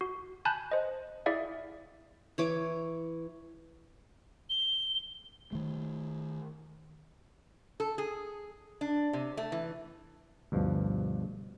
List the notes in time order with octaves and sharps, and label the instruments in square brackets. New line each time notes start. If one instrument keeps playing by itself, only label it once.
[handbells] F#4
G#5 A5 B5 F#6 G6
C5 D#5
E4 G#4 D5 E5 F5
[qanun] E3 C#5 D6
[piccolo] G7
[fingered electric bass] D#3 A3
[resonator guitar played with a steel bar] A4
G#4
D4
C3
A3
E3
[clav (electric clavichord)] D2 G2 B2 F3